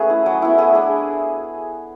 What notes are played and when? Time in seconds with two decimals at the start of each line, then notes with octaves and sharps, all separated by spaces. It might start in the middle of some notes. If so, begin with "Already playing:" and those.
Already playing: A3 C#4 F#4 G#4 B4 E5
0.10 E4
0.26 F#3
0.42 B3 E4
0.58 A3 G#4
0.75 D4